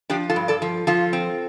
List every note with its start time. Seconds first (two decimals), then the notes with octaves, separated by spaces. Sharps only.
0.10 F3 D4 G4
0.30 F4 A4
0.36 G2
0.48 A4 D5
0.62 F3
0.87 F3 F4 A4
1.13 C4